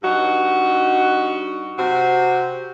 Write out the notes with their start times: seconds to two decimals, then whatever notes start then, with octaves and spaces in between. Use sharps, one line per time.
0.03 G2 D#4 F#4
1.79 C3 C4 F#4